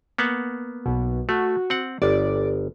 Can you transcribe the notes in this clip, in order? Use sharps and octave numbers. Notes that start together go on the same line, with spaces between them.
A#3 B3 F#5
B1 B2
A3 F#4
C4 F#5
G1 D5